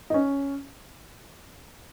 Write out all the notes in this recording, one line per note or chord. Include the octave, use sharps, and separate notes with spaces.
D#4
C#4